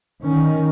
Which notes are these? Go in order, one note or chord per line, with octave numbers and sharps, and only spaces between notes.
D#3 C#4